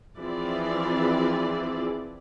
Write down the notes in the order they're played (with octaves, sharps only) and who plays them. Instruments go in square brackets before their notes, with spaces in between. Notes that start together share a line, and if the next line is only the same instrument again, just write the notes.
[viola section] E3 F3 C4 E4 G#4 D5